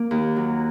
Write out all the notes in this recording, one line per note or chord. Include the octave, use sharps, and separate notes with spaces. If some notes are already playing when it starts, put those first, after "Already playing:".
Already playing: A#3
D#2
F#3